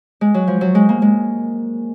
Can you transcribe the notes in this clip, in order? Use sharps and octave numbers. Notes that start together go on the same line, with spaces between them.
G#3
F#3
F3
F#3
G#3
A#3
G#3